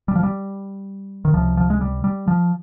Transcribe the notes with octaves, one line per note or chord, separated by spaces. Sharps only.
G3
F3
G3
D#3
C#2 C3 F3
F3
G#3
G3
G3
F3